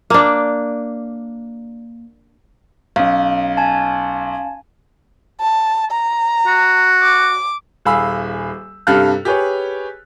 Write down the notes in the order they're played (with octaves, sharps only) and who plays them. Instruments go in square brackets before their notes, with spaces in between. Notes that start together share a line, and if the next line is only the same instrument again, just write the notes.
[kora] A#3 D4
[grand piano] B1 [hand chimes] C#4 F5
[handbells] G#5 A5
[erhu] A5
A#5
[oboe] F#4
[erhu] D6
[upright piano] D#1 G#4 F5 B5 E6
G2 C3 A4 F5 F6 F#6
G4 G#4 B4 C#5